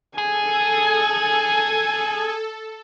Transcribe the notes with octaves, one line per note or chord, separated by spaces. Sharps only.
G#4 A4 G#5